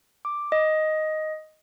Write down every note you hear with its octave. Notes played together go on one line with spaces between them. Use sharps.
D6
D#5